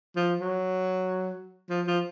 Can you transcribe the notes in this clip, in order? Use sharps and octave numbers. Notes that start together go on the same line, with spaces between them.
F3
F#3
F3
F3